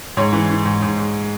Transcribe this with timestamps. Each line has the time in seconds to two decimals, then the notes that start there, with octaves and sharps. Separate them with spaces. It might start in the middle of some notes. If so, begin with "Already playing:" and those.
0.17 G#2 C#5
0.33 E3
0.49 E3
0.65 G#2
0.82 G#2
0.98 G#2